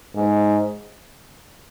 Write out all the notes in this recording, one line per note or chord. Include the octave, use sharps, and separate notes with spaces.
G#2